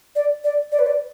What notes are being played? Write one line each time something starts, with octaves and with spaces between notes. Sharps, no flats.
D5
D5
D5
B4
D5